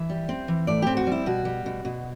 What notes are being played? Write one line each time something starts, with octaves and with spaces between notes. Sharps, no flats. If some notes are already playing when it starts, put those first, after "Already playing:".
Already playing: E3 E5
G3
C4
E3
A2 D5
C4 G4
F#4
G3 E4
B2 F#4
G3
B2
B2